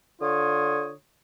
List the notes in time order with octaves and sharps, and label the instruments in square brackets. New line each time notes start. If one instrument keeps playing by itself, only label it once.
[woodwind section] D3 F4 C#5 D#6